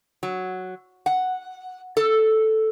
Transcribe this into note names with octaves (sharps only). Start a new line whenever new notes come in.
F#3
F#5
A4